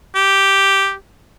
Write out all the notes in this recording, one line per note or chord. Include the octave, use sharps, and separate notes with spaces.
G4